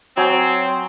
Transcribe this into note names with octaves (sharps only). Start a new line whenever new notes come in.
F#3 C4 G#5 D#6